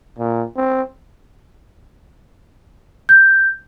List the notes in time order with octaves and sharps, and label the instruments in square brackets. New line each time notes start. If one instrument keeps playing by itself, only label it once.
[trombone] A#2
C4
[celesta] G6